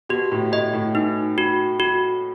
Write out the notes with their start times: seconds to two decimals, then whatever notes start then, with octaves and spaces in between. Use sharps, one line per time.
0.09 B2 G4
0.32 A2
0.52 A2 D#5
0.73 A2
0.94 B2 D#4
1.38 F#4
1.80 F#4